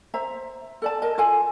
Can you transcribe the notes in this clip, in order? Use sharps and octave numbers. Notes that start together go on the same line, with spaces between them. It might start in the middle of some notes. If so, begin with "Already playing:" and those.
C5 E5 A#5
A4 D5 A5
A#4 D#5 A5
F4 A4 G#5